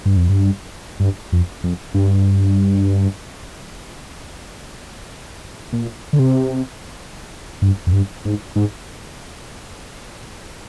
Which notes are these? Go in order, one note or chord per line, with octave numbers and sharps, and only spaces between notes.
G2
F2
G2
G2
F2
F2
G2
A#2
D3
C3
G2
F2
G2
G#2
G#2